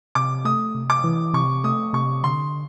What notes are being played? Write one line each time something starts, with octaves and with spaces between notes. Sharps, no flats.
C3 D6
A3 D#6
C3
D6
E3
C3 C#6
A3 D#6
C3 C#6
D3 C6